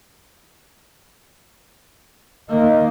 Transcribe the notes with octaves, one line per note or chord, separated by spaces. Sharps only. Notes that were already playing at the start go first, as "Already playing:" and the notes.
D#3 A#3 D#5